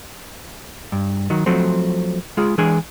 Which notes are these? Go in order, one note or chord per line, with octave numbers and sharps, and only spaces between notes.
G2
D#3 F#3
F3 F#3 A3 C4
G#3 F4 G#4
E3 G#3 D4 G#4 G#5